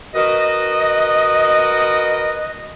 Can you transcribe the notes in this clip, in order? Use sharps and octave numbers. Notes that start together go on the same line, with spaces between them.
F#4 A#4 B4 D#5